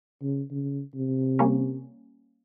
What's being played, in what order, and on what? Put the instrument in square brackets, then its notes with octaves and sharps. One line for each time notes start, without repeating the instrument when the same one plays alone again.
[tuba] C#3
C#3
C3
[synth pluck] G3 A#3 C#4